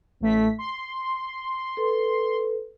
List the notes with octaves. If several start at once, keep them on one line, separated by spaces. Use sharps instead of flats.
A1 A3 B6
C6
A4 B4